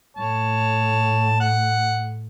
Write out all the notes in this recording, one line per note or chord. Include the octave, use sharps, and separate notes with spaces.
A2 C#5 A5
F#5